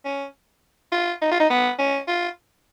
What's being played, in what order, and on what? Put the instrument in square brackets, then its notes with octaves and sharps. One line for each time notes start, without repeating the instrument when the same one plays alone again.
[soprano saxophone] C#4
F4
D#4
F4
D#4
B3
C#4
F4